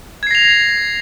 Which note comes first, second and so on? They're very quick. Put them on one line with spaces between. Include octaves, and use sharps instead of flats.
G#6 C7 A#6 F7